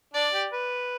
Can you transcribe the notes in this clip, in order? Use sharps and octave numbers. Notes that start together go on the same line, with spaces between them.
D4 D5
G4
B4